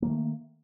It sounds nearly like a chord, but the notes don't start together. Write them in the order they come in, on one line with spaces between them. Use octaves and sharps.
A#3 F3 D#3 A3